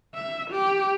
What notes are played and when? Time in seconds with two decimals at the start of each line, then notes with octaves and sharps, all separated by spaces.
0.14 E5
0.51 G4